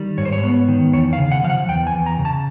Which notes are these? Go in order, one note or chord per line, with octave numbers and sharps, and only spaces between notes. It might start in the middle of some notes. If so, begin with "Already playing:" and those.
Already playing: D#3 G3
G#2 C#5
C5
C#5
B3
D#3
E2 C#5
F5
C#3
F#5
F3 F5
F#5
E2 G5
G#5
E2
A#5
C#3
A5